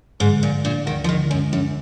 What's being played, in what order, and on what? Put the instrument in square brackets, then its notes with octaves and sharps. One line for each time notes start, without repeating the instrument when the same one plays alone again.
[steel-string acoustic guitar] G#2 [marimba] D3
[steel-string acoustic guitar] A#2 [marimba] G#3
[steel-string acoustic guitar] A#2 [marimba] D4
[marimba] D2 [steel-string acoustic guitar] D#3
[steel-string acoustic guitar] F3
[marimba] D3 [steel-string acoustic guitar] D#3
[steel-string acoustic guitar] F#2 [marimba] G#3
[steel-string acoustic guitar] F#2 [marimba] D4